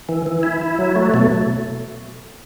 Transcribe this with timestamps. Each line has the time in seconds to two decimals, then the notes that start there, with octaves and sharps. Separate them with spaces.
0.09 E3
0.26 E3
0.43 E4
0.61 E4
0.79 F#3
0.96 A3
1.14 B2